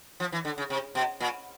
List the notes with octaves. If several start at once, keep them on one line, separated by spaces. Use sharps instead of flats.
F3
E3
D3
C#3
C3
B2
A#2